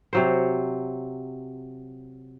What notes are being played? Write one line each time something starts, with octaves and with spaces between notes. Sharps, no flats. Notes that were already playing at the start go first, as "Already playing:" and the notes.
C3 F#3 C5